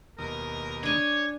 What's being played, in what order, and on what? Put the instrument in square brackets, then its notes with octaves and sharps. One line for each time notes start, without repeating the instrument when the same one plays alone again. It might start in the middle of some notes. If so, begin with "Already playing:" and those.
[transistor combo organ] D#2 B2 D#6 [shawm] A#4
[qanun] D4 G#5 [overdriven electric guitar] C#5